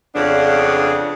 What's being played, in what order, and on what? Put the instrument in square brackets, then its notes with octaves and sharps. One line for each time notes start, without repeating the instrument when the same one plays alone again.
[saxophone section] F2 C#3 B3 D4